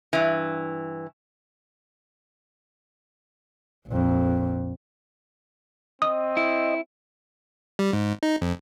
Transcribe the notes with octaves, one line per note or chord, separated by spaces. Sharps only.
G2 E3
A#1 F2
C4 D#5 D#6
E4
G3
G#2
D#4
F2